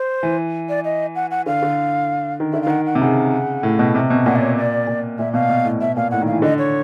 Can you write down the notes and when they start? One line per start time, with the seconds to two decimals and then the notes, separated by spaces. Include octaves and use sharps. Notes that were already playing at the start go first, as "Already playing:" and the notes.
Already playing: C5
0.23 E3
0.69 D5
0.85 D#5
1.15 F#5
1.31 F#5
1.46 D3 F5
1.62 D3
2.40 D#3
2.53 D3 E5
2.62 F5
2.67 D#3 F#5
2.86 F#5
2.95 C3
3.01 C#3 F#5
3.63 A2
3.79 B2
3.95 C3
4.10 B2
4.25 A#2 F#5
4.36 D5
4.41 C#5
4.57 D5
4.87 A#2
5.18 A#2 E5
5.34 B2 F5
5.49 B2
5.65 A2
5.81 B2 E5
5.97 A#2 F5
6.11 A2 F#5
6.21 D#3
6.27 E3 F5
6.42 D3 D#5
6.58 C#5